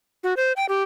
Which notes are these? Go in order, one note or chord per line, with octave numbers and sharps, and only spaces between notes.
F#4
C5
G5
G4